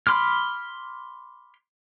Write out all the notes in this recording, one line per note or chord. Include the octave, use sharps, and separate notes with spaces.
B5 C6 D6 F6